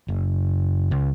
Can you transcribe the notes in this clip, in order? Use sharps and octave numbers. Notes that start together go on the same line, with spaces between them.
F#1
C#2